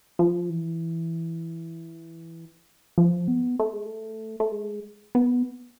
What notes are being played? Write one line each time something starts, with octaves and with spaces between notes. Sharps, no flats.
F3
E3
F3
B3
A3
G#3
A3
A3
G#3
B3